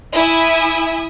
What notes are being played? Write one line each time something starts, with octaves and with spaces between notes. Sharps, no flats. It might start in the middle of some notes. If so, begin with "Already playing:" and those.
E4 E5 G#5 D#6